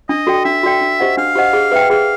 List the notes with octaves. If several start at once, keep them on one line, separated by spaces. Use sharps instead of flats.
D4 D#5
F#4 A4 D5 G5
D4 E5
F#4 A4 D5 G5
D4
G4 C5 D#5 F#5
D4 F5
G4 C5 D#5 F#5
G#4
B4 E5 G5
G#4 F5